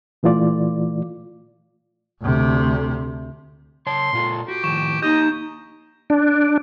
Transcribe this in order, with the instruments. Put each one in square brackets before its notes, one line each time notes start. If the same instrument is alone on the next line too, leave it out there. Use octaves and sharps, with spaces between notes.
[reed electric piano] A#2 E3 A3 F4 D5
[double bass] D2 C3
[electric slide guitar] C#3 C#5 A5 [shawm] C6
[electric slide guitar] A#2 F4 A4
[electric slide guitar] F#4 [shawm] G4
[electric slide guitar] A2 D#3 F3 [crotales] C#6 E7
[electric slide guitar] A#3 G4 [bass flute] D#4 [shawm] D#5 [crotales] G6
[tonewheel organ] D4